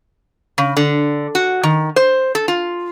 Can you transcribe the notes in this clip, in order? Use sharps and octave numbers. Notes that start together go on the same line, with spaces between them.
C#3
D3
F#4
D#3
C5
A4
F4